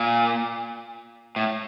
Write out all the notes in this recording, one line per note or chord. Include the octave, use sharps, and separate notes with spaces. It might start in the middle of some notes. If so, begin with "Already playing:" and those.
Already playing: A#2
A2